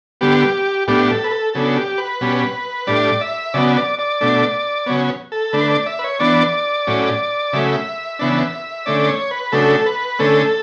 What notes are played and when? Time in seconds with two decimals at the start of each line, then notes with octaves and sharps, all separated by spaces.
0.21 D3 G3 B3 G4
0.87 A2 G3 B3 D4 G4
1.10 A4
1.24 B4
1.31 A4
1.54 C#3 F#3 B3 D4 A4
1.76 G4
1.98 B4
2.21 B2 G3 C#4
2.87 A2 G3 D4 D5
3.21 E5
3.54 C#3 F#3 B3 D5
3.77 D5
3.99 D5
4.21 B2 A3 D4
4.86 C#3 F#3 B3 C#5
5.32 A4
5.53 D3 A3 D4 B4
5.70 D5
5.86 E5
5.99 B4
6.04 C#5
6.19 E3 B3 D4 D5
6.87 A2 F#3 C#4
7.53 C#3 F#3 A3 E5
8.19 C#3 E3 B3 D4
8.86 D3 A3 C#4 D5
9.09 C#5
9.31 B4
9.52 C#3 F#3 A3 D4 A4
9.86 B4
10.19 D3 A3 C#4 A4